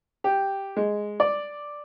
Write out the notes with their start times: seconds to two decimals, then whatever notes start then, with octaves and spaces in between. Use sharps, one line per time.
0.24 G4
0.76 G#3
1.20 D5